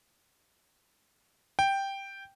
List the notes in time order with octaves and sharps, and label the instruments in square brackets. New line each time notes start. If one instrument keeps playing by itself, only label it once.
[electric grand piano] G5